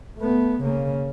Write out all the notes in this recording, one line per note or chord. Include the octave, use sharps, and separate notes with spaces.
A3 B3
C#3 A#3